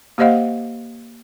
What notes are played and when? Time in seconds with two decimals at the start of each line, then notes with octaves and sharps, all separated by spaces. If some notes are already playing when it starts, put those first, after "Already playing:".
0.18 A#3 G4 C5 D#5 F5 F#5